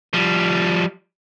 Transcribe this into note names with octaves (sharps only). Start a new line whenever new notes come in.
F3 G3